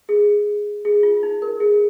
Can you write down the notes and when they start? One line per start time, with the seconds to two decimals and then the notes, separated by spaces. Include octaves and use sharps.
0.09 G#4
0.85 G#4
1.03 F4
1.23 D#4
1.42 A#4
1.60 G#4